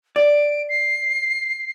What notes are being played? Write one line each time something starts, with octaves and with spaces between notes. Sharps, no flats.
D5 D7
C7